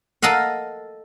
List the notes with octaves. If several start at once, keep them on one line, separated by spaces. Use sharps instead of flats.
A4 A#4 D#5 F5 F#5